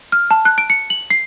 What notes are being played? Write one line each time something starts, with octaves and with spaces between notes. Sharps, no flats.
F6
A5
F#6
D7
C#7
F#7
C7